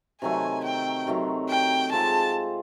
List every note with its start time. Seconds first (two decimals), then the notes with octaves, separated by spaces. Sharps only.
0.22 C3 D#3 F#3 A3 G#5
0.64 G5
1.07 C3 D#3 F#3 A3
1.49 G5
1.92 G#3 C4 F4 A5